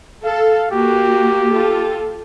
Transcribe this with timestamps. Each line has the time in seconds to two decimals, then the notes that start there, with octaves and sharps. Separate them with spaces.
0.24 A4 F5
0.71 A#3 F#4 G4
1.50 F4 A4